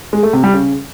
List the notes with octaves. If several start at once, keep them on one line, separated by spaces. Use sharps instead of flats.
G#3
A3
C3
G3
C#3